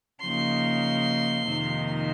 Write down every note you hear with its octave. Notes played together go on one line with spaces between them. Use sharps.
C#3 F3 A#3 D#4 C6
F2 C3 D#3 A#3 D#4